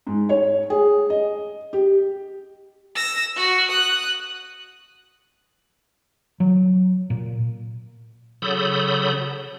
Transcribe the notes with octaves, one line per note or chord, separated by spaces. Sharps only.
G#2
C#5
G#4
D#5
G4
E6 A#6
F#4
D#6 F#6
F#3
A#2
C#3 F#3 A4 B5 D#6 G6